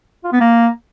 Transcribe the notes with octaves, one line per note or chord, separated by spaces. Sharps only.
F4
B3
A#3